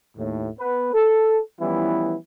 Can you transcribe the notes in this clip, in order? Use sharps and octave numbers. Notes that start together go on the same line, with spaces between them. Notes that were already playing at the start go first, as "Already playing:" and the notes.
D#2 A2
B3 B4
A4
E3 F3 G3 B3 C#4 E4